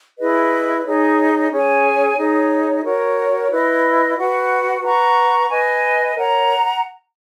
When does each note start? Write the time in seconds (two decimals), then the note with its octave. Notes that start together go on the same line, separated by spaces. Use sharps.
0.19 E4 G#4 B4 D#5
0.84 D#4 G#4 C#5
1.51 C#4 G#4 C#5 G#5
2.18 D#4 G#4 C#5
2.84 F#4 A#4 C#5
3.50 E4 B4 D#5
4.17 F#4 B4 F#5
4.82 B4 F#5 A#5 C#6
5.49 B4 D#5 G#5
6.15 A#4 C#5 F#5 A#5